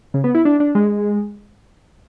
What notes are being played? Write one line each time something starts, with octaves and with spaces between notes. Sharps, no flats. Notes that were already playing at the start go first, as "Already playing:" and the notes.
C#3
B3
E4
D4
D4
G#3